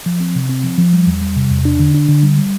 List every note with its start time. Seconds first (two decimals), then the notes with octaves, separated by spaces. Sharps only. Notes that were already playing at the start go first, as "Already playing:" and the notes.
0.06 F3
0.20 C4
0.35 C3
0.49 C4
0.64 F3
0.78 F3
0.93 G3
1.07 E2
1.22 G3
1.37 C3
1.50 E2
1.65 D4
1.79 D3
1.95 D4
2.09 D3
2.23 G3
2.38 G3